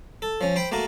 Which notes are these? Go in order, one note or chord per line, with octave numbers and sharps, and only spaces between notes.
A4
F3 C#4
C5 G5 B5
A3 A#3 F#4 A#4